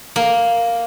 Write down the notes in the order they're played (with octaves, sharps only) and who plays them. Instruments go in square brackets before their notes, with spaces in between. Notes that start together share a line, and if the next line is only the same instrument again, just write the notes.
[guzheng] A#3